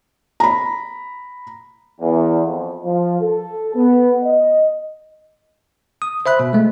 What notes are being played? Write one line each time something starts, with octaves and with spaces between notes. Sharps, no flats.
A#5 B5
E2
F2
F3
A4
B3
D#5
D#6
C5 E5 B5 F#6
B2
G#3 A3